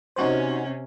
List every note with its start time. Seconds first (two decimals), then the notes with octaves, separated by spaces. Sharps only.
0.16 C3 C#4 D#4 F#4 C5